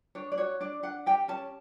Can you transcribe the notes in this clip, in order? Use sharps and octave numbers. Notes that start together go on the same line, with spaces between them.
D4 C#5
D5
F#4 C#5
D4 D5
D4 F#5
G4 G5
C#4 A5